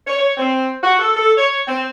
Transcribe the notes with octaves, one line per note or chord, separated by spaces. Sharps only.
C#5
C#5
C4
F#4
A4
A4
C#5
C4